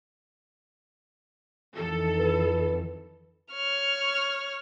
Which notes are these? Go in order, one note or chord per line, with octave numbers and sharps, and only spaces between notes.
F2 D#3 E3 A4
B4
C#5 F6